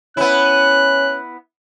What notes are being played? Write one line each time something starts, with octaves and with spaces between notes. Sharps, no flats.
B3 C#4 E4 F#6